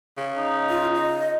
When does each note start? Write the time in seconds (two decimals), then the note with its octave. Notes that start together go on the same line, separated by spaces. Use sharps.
0.17 C#3
0.38 D#4
0.70 F4
0.95 D#5